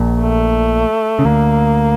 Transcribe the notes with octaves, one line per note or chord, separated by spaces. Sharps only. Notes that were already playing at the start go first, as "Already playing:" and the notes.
Already playing: A#1 A#2
A3
C#3
D2 D3 A#3